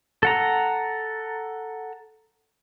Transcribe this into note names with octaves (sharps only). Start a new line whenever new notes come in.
A4 F#5 A#5